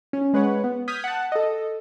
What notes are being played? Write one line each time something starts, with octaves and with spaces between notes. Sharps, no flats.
C#4
G#3 B4 C#5 F#5
B3
D#6 F6 G6 G#6 B6
F#5 A5
A4 D#5